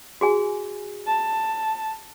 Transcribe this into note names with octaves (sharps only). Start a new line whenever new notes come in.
F#4 G#4 G#5
A5